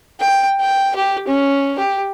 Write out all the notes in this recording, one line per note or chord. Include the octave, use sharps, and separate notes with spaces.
G5
G5
G4
C#4
G4